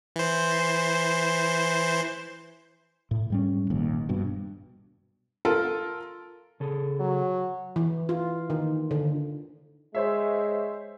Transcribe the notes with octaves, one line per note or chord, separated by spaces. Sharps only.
E3 C5
A2
G#2 G3 C#4
D#1 A#1 D#2
G2 B2
F4 A4 A#4
C#3 G#4 A4
F#3
E3
F4
D#3
D3
G#3 C5 C#5 E5